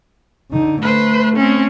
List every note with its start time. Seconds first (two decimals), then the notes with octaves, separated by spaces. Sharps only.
0.51 D3 D#4
0.82 A3 B4 C5
1.36 C4 C#4